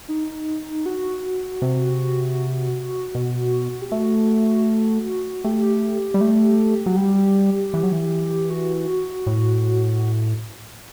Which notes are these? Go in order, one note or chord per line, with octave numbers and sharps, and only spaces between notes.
D#4
F#4
C3
B2
G4
A3 F#4
A3 G4
G3
A3
F#3
G3
E3
F#3
E3
F#4
A2